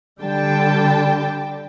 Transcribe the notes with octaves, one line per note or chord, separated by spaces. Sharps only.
D3 G3 G5 A5